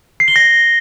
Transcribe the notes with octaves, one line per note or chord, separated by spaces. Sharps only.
C7
G7
A#6